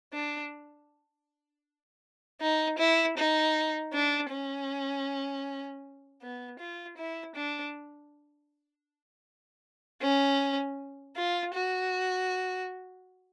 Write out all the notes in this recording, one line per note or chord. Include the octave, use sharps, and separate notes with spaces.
D4
D#4
E4
D#4
D4
C#4
B3
F4
E4
D4
C#4
F4
F#4